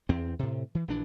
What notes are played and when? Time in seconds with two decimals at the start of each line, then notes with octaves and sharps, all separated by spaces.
0.09 E2 C4
0.39 A2 C3
0.75 E3
0.88 A#1 E3 D4